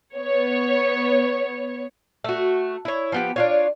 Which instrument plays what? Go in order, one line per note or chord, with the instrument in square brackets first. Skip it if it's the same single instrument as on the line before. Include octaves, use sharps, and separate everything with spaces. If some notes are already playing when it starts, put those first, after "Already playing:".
[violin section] B3 C#5
[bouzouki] A3 F#4
E4 C#5
F3 B3 G4
D4 F4 C#5